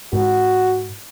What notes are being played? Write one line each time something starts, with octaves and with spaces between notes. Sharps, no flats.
G#2 F#4